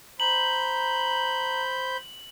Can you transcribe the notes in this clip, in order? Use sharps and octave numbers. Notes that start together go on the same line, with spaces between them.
C5 A#5 B5 G6 F#7